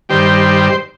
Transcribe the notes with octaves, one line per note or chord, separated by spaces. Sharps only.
G2 D#3 G3 C5